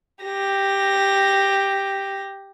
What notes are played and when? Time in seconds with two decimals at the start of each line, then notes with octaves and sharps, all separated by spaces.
0.25 G4 A#6